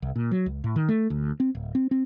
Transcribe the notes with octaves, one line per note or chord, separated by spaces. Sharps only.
C2
A#2
F#3
C#2
A2
D#3
A3
D2
C4
D1
C4
C4